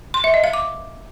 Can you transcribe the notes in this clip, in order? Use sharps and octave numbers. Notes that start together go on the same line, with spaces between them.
C6
E5
D#5
F5
D6